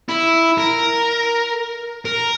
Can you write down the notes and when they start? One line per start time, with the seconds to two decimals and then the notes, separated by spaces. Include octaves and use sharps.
0.09 E4
0.58 A#4
2.05 A#4